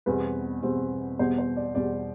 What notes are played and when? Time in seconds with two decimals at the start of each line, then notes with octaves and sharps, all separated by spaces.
0.06 E2 B2 G3 C4 B4
0.63 E2 B2 G3 C4
1.19 E2 B2 G3 B3 C5
1.38 C5
1.57 D5
1.75 E2 B2 G3 B3 D5